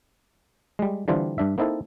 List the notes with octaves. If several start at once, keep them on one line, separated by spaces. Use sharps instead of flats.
G3 G#3
D3 E3 G3 C4 D4 F4
G2 D4 E5
A#3 C4 D#4 E4 A4